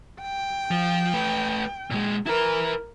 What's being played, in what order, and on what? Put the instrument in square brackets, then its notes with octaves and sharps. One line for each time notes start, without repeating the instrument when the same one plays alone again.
[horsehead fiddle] G5
[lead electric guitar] F3
A3 B4
A#2 G#3
[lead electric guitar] E4 B4 [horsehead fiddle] A#4